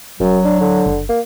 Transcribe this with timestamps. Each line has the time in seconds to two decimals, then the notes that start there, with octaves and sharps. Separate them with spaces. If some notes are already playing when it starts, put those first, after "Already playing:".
0.20 E1 F#2 F#3
0.44 D4
0.61 D3
0.86 F#1
1.09 A#3